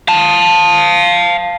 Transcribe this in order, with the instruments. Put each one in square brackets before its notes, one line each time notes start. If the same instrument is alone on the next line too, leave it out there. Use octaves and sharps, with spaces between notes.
[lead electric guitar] F5 A5